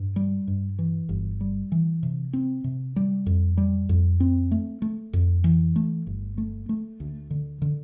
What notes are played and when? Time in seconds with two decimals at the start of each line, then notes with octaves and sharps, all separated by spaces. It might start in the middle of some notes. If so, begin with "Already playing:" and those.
Already playing: G2
0.16 G3
0.48 G2
0.79 E3
1.09 G1
1.41 G3
1.72 E3
2.03 C3
2.33 C4
2.64 C3
2.96 G3
3.26 F2
3.57 G3
3.89 F2
4.20 C4
4.51 A3
4.82 A3
5.13 F2
5.44 E3
5.76 A3
6.07 G1
6.38 A3
6.69 A3
7.00 D2
7.31 D3
7.62 D3